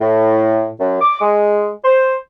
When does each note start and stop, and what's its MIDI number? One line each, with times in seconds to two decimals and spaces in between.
0.01 0.69 45
0.80 0.97 42
1.02 1.19 86
1.22 1.69 56
1.84 2.16 72